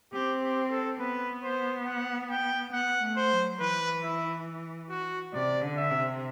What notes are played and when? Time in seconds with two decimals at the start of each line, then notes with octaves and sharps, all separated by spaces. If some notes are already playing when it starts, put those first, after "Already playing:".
0.12 C4 G4
0.42 G4
0.70 A4
0.99 B3 B4
1.43 C5
1.86 F#5
2.29 G5
2.72 B3 F#5
3.02 A3
3.16 C5
3.31 F#3
3.60 E3 B4
4.03 E4
4.90 F#4
5.33 C3 D5
5.62 D3
5.76 E5
5.91 C3